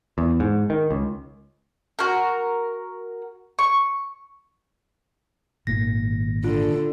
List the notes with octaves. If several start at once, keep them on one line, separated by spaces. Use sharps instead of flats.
E2
G#2
D#3
C#2
F#4 A#4
C#6
G#1 A#2 D#3 A#6
D3 F4